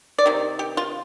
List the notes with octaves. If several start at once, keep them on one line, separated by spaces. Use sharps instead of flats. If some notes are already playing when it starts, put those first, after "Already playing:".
D5
C3 D#3
G4
F4